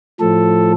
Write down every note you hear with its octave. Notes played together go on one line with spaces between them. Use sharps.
A2 F3 A4